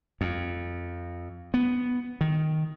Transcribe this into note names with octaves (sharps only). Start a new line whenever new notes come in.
F2
B3
D#3